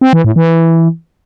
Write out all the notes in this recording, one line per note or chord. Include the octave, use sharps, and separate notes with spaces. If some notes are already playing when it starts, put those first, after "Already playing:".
C4
E3
A2
E3